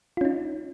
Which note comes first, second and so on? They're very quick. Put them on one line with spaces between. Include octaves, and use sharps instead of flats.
F4 C#4 D#4